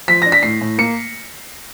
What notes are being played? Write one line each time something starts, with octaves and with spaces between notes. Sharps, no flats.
F3 B6
D4 A#6
B6
A2 C7
A2
A#3 C#7